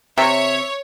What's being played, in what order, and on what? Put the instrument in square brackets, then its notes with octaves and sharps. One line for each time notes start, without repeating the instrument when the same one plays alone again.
[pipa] C3 [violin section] C#5 [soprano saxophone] E5